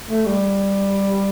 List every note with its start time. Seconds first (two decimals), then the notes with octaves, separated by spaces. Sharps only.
0.08 A3
0.26 G3